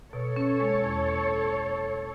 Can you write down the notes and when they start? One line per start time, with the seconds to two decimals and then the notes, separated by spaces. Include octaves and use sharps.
0.12 B2 A4 C#5
0.36 C#4
0.60 G#3
0.84 E2